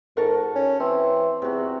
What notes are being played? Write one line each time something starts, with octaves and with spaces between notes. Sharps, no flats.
G#2 F#4 A4 A#4
C#4
E3 C4
E2 C3 F#4